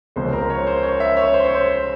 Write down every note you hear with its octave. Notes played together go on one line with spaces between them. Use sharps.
C#2 C#3 F3 G#3 C#4 C5
A#4
C#5
C5
C#5
E5
C#5
C5
C#5
C5